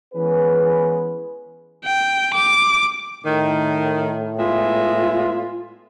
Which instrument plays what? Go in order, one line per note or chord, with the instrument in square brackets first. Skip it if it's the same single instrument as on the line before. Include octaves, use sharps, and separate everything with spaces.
[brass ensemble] E3 G#3 B3 C#4 G#4 B4
[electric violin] G5
D6
[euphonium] A2 [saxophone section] D#3
[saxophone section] G#3 B3 E5 [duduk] F4